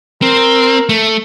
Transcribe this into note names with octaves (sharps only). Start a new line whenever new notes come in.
C4 A#4
A3